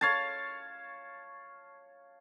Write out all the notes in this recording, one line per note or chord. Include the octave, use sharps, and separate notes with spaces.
C#5 F5 A5